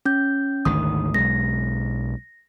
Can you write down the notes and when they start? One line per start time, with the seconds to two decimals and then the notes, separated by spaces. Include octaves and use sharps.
0.05 C#4 G6
0.65 G#1 D2 D#3 D#6
1.14 B1 G#3 A#6